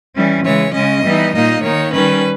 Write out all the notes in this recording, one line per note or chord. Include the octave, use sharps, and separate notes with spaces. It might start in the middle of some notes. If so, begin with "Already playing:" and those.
E3 G3 C#4
C#3 E3 G#3 C#5
C#3 G#3 C#4 D#5
E3 G3 B3 D#4
A#2 A#3 D#4 D#5
D#3 A#3 D#4 C#5
D#3 G3 C#4 B4